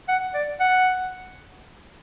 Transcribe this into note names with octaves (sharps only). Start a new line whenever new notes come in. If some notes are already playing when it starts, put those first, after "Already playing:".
F#5
D5
F#5